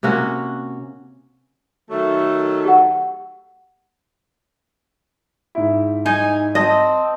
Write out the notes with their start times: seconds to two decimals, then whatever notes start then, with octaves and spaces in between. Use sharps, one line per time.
0.03 C3 A#3 C#4 F#4
1.90 D#3 F#3 A3
2.65 G4 F#5
5.55 G#2 E4
6.06 D#4 G#5
6.55 C4 D#5 A5 D#6